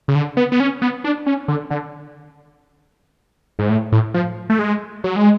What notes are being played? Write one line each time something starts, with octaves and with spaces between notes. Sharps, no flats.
C#3
D3
B3
B3
C#4
B3
D4
C#4
D3
D3
G#2
A2
A2
F3
A3
G#3
F#3
G#3